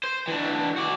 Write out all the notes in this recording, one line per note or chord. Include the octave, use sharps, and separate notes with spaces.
C5
E3 D4
F#4 D5